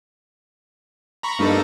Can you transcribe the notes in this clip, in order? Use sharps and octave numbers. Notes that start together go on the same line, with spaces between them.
A#5 B5 C#6
G2 A#3 D#4 A4